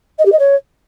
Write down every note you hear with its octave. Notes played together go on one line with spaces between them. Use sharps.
D#5
G4
D#5
C#5